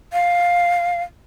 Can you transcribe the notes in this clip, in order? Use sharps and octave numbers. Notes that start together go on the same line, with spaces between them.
F5